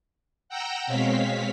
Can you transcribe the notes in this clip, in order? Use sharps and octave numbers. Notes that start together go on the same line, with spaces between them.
F#5 G5 A#5 E6 G6 A#6
B2 G#3 C4 C#5 F5 B6